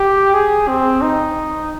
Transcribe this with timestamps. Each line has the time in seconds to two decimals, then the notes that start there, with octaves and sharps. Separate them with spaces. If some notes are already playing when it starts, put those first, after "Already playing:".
Already playing: G4
0.34 G#4
0.68 C4
1.02 D#4